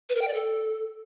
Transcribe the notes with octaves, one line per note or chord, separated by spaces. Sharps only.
B4
A#4
G5
D5
A4